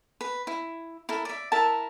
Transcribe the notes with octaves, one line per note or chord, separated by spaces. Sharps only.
B4
E4
E4 A4 A#4
D5 E5
E4 A#4 E5 A5